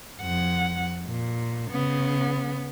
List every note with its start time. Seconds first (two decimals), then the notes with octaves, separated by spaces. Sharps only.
0.22 F2 F#5
1.06 A#2
1.71 C#3 B3